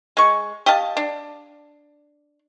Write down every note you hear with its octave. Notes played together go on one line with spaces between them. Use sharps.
G#3 C#6
G4 D#5 F5 A5
D4